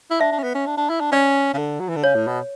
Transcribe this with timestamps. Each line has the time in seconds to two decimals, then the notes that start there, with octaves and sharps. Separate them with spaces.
0.11 E4
0.21 D4 E5
0.32 D4
0.39 C#4
0.44 B3
0.55 C#4
0.67 D4
0.77 D4
0.89 E4
1.01 D4
1.12 C#4 D5
1.54 C#3
1.58 D3
1.80 F#3
1.89 E3
1.96 D3
2.04 C#3 C#5
2.15 A2
2.27 B2